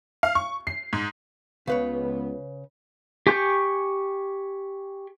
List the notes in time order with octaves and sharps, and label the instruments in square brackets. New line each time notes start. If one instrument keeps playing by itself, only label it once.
[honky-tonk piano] F5
C#6
C7
G#2
[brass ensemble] C#2 B3 [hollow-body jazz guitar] C#3 B4 C#5
[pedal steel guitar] G4 G#5 C#6 G6